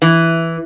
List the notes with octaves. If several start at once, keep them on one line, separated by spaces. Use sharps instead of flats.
E3